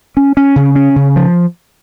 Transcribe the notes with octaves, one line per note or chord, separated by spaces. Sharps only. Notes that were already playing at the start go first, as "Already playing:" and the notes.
C#4
C#4
C#3
C#4
C#3
F3